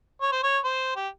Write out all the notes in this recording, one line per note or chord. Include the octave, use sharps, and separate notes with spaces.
C#5
C5
C#5
C5
G4